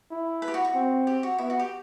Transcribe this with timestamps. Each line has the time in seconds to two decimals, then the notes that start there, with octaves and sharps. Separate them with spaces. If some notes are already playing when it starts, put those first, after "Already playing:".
0.11 E4
0.42 B4
0.48 G4
0.54 F#4
0.65 F#4
0.75 C4
1.07 G4
1.23 F#4
1.38 B3 E4
1.50 F#4
1.59 G4